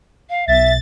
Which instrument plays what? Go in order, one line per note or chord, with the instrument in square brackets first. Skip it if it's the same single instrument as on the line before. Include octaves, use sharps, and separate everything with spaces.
[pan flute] F5
[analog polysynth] B1 A6 [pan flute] E5